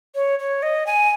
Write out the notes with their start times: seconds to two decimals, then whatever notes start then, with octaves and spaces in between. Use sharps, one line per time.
0.15 C#5
0.39 C#5
0.62 D#5
0.86 G#5